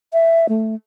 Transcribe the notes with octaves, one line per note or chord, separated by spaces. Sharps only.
E5
A3